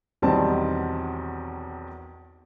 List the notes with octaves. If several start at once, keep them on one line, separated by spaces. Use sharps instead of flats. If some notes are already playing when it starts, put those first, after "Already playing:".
B1 E2 D#3 G3 C4 A5